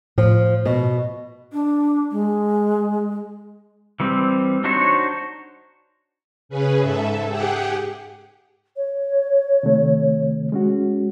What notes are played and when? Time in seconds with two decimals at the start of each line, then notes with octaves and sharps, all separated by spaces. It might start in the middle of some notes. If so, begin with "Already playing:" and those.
0.18 A2 F3
0.65 B2
1.53 D4
2.11 G#3
4.00 E3 G3 C4
4.64 D4 D#4 F#4 C5 C#5
6.49 C#3 C#4 G#4 B4
6.80 G#2 A4 E5
7.28 G4 G#4 F#5 G5
8.76 C#5
9.63 C3 D#3 A3
10.52 G#3 C#4 F#4